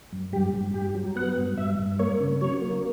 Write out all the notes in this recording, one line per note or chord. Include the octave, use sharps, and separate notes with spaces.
F#2
G2 G4
G2
G2 G4
F#3
B3 F#5
G2
G2 E5
G2
A#3 C#5
C#3
F#3 C#5
A#3